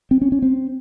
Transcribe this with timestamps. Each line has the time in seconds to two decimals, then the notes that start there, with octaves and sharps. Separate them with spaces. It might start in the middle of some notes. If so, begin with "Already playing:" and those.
0.11 C4
0.21 C#4
0.32 C#4
0.42 C4